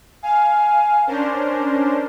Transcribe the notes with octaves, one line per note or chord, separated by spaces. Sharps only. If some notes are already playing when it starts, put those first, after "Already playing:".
F5 G#5
C#4 D4 A#4 C5